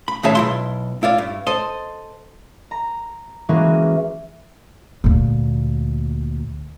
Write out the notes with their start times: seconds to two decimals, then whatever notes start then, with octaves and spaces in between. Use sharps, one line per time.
0.08 B5
0.23 A2 D#3 G#4 C#5 E5 A5
0.35 B1 E4 C6
1.03 E4 F4 D5
1.18 G2
1.46 A4 C5 D#5
2.71 A#5
3.49 E3 G#3 A#3 C#4 F#4
5.04 D2 A#2